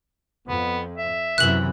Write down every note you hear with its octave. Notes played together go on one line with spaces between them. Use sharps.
F2 B3
E5
F#2 C3 E3 F#6 F#7